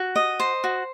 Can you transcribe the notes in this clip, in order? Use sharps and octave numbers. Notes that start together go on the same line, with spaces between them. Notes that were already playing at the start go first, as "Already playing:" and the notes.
Already playing: F#4
D#5
C5
F#4